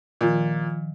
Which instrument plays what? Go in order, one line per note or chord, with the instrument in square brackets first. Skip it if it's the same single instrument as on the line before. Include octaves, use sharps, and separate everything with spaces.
[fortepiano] A#2 [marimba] D#3 F3